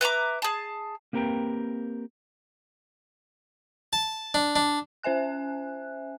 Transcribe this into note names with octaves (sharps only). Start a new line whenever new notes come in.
B4 E5 A#5 D6
G#4 A5
A#3 C4 G4 A#4 B4 G5
A5
D4
D4
C#4 C5 E5 G#5 F#6